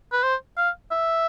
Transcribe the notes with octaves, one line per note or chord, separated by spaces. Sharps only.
B4
C5
F5
E5